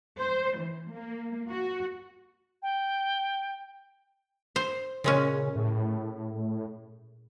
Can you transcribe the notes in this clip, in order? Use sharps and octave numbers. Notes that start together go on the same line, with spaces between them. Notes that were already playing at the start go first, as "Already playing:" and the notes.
C5
E3
A#3
F#4
G5
C5
A#2 C#3 G#3 C#4
A2